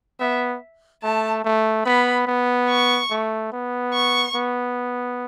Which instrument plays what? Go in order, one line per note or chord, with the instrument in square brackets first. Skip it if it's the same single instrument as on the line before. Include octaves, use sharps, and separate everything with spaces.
[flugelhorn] B3 [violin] E5
[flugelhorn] A3 [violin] A5
[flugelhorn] A3
[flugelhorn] B3 [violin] B5
[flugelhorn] B3
[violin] C#6
[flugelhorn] A3
B3
[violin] C#6
[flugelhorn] B3